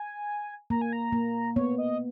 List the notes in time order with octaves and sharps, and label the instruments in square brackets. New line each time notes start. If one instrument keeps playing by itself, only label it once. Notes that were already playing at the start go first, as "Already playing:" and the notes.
Already playing: [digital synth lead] G#5
[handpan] A#3 [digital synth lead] A#5
[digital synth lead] G#5
A#5
[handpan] A#3
[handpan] B3 [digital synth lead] C#5
[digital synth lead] D#5